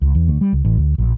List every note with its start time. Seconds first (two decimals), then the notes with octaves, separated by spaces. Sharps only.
0.01 C#2
0.15 E2
0.28 D2
0.41 G3
0.53 C#2
0.65 A1
0.77 D2
0.98 A#1